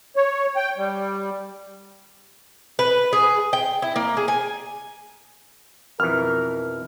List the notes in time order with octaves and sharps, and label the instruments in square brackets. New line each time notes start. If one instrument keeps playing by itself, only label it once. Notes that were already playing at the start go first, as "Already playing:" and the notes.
[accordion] C#5
G5
G3
[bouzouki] B4
G#4
G5
E4
A#3
G#4
G#5
[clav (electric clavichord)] F2 B2 E3 [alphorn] A#4 [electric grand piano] F6